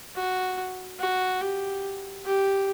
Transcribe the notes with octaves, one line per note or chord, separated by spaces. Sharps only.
F#4
F#4
G4
G4